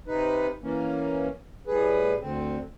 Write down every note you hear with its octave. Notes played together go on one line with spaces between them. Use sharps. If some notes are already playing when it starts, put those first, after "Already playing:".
C3 D#4 B4
E3 A#3 C#4
A2 G3 G#4 B4
D2 D3 C4